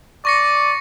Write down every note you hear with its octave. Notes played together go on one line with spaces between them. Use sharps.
D5 C#6 A#6 C#7